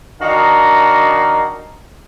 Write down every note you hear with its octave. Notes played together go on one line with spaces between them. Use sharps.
D#3 D4 D#4 F#4 F5 A#5